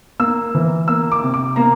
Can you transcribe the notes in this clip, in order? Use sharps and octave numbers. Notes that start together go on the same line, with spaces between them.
A#3 E6
E3
A#3 E6
D6
C3
D6
A#3 A#5